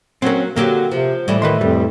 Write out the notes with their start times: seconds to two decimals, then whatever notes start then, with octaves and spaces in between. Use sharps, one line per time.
0.22 F#3 A#3 C4 C#4
0.56 D3 F#3 A#3 G4
0.92 C3 F3
1.28 A2 E3 G3
1.42 D#3 B4 D#5 C6
1.61 F2 G3